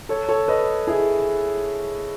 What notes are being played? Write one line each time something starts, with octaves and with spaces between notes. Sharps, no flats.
A4 C#5
A4 C#5
B4 D#5
E4 G#4